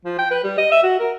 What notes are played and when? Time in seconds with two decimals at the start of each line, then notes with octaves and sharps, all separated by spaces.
0.05 F3
0.19 G5
0.31 B4
0.44 G3
0.58 D#5
0.71 E5
0.83 F#4
1.00 A#4